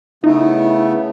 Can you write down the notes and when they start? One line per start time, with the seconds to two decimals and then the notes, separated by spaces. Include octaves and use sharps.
0.24 C#3 A3 B3 D#4 E4